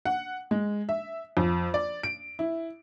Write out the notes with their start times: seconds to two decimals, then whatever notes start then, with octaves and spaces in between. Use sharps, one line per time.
0.05 F#5
0.51 G#3
0.89 E5
1.37 F2
1.74 D5
2.03 D7
2.39 E4